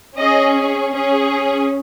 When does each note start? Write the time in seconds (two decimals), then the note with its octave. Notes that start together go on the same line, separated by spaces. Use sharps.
0.17 C#4 G#4 D#5
0.92 C#4 G#4